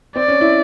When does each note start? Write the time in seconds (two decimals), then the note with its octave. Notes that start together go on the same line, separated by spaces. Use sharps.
0.16 C4 D5
0.28 C#4
0.41 E4